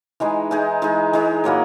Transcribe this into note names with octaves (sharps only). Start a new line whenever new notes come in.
E3 G#3 D#4 G#4
E3 G#3 D#4 G#4
E3 G#3 D#4 G#4
E3 G#3 D#4 G#4
A#2 F#3 A#3 E4